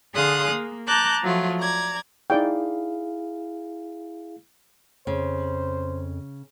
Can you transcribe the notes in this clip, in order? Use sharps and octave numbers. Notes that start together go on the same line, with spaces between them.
D3 G#4 F5 C6 D#6 F#6
A#3
A5 A#5 D6 F#6 G6
F3 F#3 A3 F4
D5 A#5 G#6
D#4 E4 G#4 D5 F5 G5
F2 C#3 C5